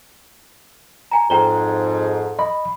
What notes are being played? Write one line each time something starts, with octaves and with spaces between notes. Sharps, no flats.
G#5 A#5
F2 G#2 G5 A#5 G7
D#5 B5